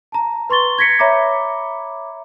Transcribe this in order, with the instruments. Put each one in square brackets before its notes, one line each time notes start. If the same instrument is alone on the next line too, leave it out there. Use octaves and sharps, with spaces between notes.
[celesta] A5 A#5
B4 C6 C#6 A6 G7
G#6 A#6 B6 C#7
C#5 E5 A#5 B5 D6